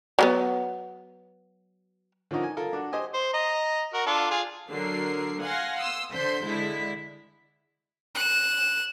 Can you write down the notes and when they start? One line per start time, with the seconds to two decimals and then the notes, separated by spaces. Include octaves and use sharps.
0.19 F#3 G3 B3
2.31 D3 F3 C#4 D#4 A#4
2.43 G#5
2.57 F4 A4 A#4
2.73 D4 F#4
2.93 G4 C5 D#5 G#5
3.14 C5
3.34 D#5 A#5
3.93 F#4 A#4
4.06 D4 F4 A4
4.30 F4 G#4
4.70 D3 F#3 A#4 C7
5.42 F5 F#5 G#5 C6 A#6
5.78 C6 D#6 E6
6.11 D3 C5 C6 G6 B6
6.46 D3 G#3 E4 B6
8.15 F#6 E7